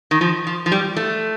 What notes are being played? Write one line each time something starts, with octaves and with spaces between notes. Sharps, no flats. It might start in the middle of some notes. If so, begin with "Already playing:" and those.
D#3
F3
F3
F3
G3
A3